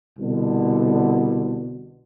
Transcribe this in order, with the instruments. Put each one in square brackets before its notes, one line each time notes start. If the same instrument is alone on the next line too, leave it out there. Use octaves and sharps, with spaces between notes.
[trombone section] C2 B2 D3